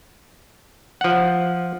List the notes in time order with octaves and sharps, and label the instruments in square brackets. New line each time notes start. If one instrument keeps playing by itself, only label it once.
[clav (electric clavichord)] F3 F#5